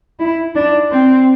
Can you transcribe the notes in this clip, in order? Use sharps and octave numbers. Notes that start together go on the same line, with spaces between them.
E4
D4
C4